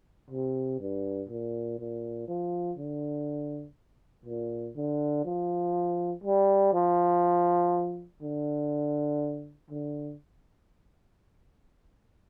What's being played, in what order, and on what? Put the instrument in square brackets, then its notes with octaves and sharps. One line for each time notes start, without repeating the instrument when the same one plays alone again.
[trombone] C3
G2
A#2
A#2
F3
D3
A#2
D3
F3
G3
F3
D3
D3